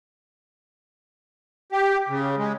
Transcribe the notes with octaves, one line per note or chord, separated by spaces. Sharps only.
G4
C#3
G#3